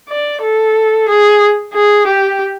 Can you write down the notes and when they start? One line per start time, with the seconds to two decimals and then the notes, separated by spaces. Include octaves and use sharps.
0.09 D5
0.42 A4
1.09 G#4
1.74 G#4
2.07 G4